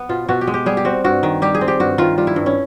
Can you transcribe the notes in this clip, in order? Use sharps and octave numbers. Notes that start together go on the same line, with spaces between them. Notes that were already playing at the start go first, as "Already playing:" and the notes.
Already playing: B3
B2 F4
B2 F#4
G4
G#3
G4
G3 G#4
G4
C4 F#4
G2 F#4
D#3
G3 G4
G#4
C4
G4
G2 F#4
D#3 F4
G3 F4
E4
G2
C#4